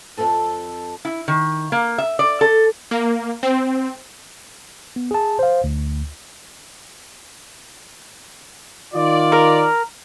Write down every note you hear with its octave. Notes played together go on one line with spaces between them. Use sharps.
F2 B2 C4 A4 A5
E4
D#3
A#3
E5
D5
A4
A#3
C4
B3
G#4 A5
C5 F5
D2
D#3 F4 D5
A#4